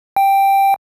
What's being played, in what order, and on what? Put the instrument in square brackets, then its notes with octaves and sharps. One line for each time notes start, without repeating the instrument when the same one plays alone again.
[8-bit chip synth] G5